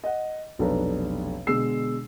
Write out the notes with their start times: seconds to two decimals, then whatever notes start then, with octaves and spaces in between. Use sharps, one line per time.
0.04 D#5 F#5
0.59 F1 B1 D4 A4 B4 A#5
1.47 B2 D3 G#3 E6 C7